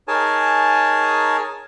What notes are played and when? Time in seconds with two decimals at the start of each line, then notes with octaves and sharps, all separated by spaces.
0.08 D#4 G#4 A#4 C#5 G#5 A5